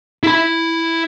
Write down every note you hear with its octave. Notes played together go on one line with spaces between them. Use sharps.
E4 B5